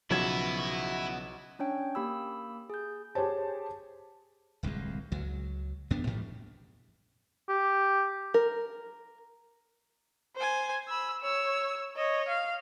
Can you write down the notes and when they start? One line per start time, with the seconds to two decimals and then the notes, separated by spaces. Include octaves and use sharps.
0.11 B1 C#3 F3 F#3 B3 E4 F#4 G#6
1.59 C#4 D4 C#5 G5
1.95 A#3 G4 B5 E6
2.70 G#4 G6
3.15 G4 G#4 C5 C#5 A5
4.63 D1 C2 F2 G#3
5.12 C#2 F#3
5.91 E2 B3 D4
6.07 A1 G#2 F3 G3
7.49 G4
8.34 A#4
10.36 C5 G#5
10.89 B5 E6
11.22 C#5 E6
11.97 C#5 D#5
12.28 F5